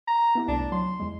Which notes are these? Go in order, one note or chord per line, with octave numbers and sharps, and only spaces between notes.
A#5
B3 E4 G4
C2 A3 D4
F#3 C6
E2 G#3